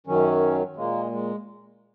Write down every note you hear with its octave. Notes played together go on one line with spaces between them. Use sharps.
F#2 D#3 F#3 C#4
A#2 G#3 A#3
G#3